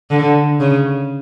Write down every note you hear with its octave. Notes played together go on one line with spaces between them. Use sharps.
D3
C#3